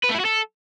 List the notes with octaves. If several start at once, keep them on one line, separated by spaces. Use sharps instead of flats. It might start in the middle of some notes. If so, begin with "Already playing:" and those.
B4
A3
E4
F#4
A4